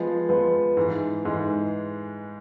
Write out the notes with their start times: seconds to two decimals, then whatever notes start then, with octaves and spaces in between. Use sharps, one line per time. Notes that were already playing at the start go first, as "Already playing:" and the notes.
Already playing: F3 G#3 B3
0.29 F3 G#3 B3
0.77 G#2 E3 G#3
1.25 G#2 E3 G#3